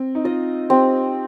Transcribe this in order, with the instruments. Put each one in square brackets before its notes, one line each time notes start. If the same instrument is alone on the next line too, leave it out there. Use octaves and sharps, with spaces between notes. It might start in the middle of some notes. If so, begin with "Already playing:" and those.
Already playing: [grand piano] C4
D#4
[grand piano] F4 [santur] D#5
[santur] C4 [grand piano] G4